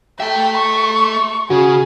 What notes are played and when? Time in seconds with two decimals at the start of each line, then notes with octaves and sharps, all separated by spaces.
0.20 A4 E5 G5
0.58 C#6
1.50 C#3 F#4 G#4